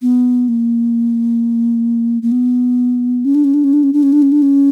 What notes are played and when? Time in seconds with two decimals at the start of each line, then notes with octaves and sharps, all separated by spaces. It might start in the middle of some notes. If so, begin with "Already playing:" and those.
0.02 B3
0.48 A#3
2.22 A#3
2.32 B3
3.25 C#4
3.35 D4
3.44 C#4
3.54 D4
3.64 C#4
3.73 D4
3.83 C#4
3.93 D4
4.03 C#4
4.13 D4
4.22 C#4
4.32 D4
4.42 C#4